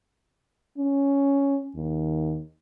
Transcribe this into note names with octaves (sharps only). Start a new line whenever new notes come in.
C#4
D#2